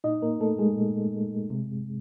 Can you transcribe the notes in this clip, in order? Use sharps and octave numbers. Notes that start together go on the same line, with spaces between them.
A#2 D#4 D#5
A#3 A#4
A3 A4
G#3 G#4
A#2
C3